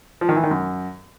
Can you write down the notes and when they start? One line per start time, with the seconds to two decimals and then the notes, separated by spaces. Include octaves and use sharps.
0.21 F3
0.29 D#3
0.36 E3
0.43 D#3
0.51 F#2